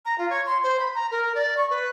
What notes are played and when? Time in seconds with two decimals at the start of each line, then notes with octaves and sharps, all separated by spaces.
0.05 A#5
0.18 F4
0.29 C#5
0.46 C6
0.63 C5
0.79 B5
0.94 A#5
1.11 A#4
1.35 D5
1.57 C#6
1.70 B4